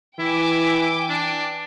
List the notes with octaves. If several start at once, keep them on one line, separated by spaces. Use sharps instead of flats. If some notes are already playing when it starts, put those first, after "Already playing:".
E3 E4 G5 G#5 D6
D4